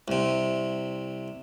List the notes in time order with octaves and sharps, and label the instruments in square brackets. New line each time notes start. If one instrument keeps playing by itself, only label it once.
[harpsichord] C2 C3